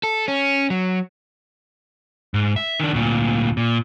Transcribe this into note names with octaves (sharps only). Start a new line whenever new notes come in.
A4
C#4
F#3
G#2
E5
D#3 D4
D2 A#2
A#2